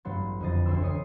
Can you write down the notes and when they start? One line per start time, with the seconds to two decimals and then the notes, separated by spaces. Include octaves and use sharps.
0.05 A1 G2 F#3 B3 C6 A6
0.40 F2 D3 D#5 A6
0.66 E1 D2 C6 E6
0.81 C#3 C#5 D#6 C7